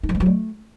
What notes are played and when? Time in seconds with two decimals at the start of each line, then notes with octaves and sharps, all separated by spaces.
0.03 D#4
0.09 F3
0.15 G#3
0.20 F#3
0.26 A3